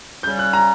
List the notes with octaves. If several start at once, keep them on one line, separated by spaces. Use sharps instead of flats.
C#3 G3 C#4 G6
F#6
A#5